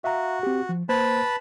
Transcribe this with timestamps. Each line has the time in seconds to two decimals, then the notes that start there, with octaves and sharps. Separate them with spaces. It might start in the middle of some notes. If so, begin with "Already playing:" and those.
0.04 F#4 E5 F5 A#5
0.43 C4 G4
0.69 F3
0.89 A#3 B4 C5 A5 B5 G#6